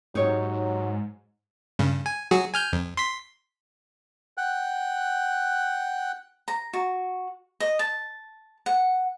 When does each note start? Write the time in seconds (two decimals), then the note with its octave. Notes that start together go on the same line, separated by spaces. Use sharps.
0.15 G#2 F#3 D#4 G4 C#5
1.79 G2 C#3
2.06 G#5
2.31 F#3 F#4 G#4
2.54 G#5 F6 G6
2.73 F2
2.97 C6 B6
4.38 F#5 G5 F#6
6.48 A#5
6.73 F#4
7.60 D#5
7.79 A5
8.66 F#5